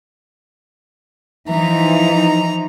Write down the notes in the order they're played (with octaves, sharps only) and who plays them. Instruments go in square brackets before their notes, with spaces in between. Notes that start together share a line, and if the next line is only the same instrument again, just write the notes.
[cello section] E3 F3 D#4 [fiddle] A#5